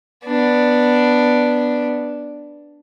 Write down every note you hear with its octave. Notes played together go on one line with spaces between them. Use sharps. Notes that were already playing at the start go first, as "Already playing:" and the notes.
B3 D4